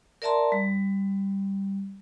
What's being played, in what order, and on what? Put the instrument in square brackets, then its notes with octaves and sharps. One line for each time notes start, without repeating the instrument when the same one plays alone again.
[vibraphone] A#4 D5 E5 A5 A#5 C6
G3